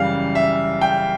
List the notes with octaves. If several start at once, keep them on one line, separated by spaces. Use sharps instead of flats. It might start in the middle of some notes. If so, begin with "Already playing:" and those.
Already playing: F#2 C#3 E3 G3 F5
E5
G5